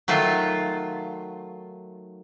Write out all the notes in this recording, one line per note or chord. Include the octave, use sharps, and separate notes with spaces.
D#3 F#3 A3 F4